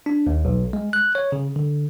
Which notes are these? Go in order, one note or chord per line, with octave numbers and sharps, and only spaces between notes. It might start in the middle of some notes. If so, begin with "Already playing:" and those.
D4
D#2
B1
G#3
F#6
C#5
C#3
D3